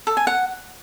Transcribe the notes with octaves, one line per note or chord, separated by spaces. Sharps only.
A4
G#5
F#5